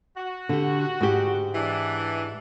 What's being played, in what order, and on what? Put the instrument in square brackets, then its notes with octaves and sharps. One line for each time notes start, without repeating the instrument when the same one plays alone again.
[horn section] F#4
[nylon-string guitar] D3 G4
G#2 G4
[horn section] E3 D4